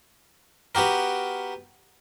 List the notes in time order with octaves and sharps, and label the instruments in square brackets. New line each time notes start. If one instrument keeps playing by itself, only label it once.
[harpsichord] B3 F#4 G4 A#4